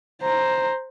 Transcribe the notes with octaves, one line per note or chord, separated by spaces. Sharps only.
C5 A#5